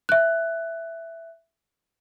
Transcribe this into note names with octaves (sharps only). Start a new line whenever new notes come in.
E5 F#6